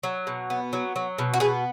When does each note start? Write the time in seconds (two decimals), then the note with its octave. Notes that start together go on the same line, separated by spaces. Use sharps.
0.03 F#3
0.27 B2
0.50 B3
0.73 F#3
0.96 F#3
1.18 B2
1.34 F#4
1.40 B3 G#4